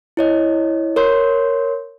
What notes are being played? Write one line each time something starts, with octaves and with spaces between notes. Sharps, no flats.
E4 C#5 D#5
A#4 C#5 C6 G6